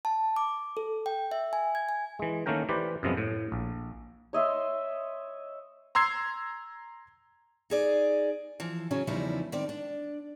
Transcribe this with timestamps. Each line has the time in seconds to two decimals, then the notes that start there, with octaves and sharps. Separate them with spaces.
0.05 A5
0.36 D6
0.77 A4
1.06 G5
1.31 E5
1.53 G#5
1.75 G#6
1.89 G#5
2.19 E3 G#3
2.46 D#3 A3 A#3 C#4 A#4 G5
2.69 E3 G4 B4 C5 D5
3.03 F#2 C3 F3 G#3 B3
3.17 A2
3.52 A#1
4.33 C#5 D#5 E5 C6
5.95 A#5 C6 E6 G#6 C7
7.70 D#4 G#4 D5
8.60 E3 F3
8.91 C#3 F#3 C#4
9.07 E2 C#3 F3 G3 D#4 E4
9.52 D#3 C4 D5
9.69 D4